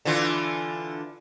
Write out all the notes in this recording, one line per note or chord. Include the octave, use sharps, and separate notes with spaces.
D3 E3 F4